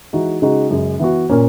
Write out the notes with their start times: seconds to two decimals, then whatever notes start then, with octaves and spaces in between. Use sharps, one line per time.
0.13 E3 G#3 D#4 F#4
0.42 C#3 G#3 D#4 F#4
0.70 F#2 C#3 G#3
0.99 E3 B3 F#4
1.29 A#2 A#3 C#4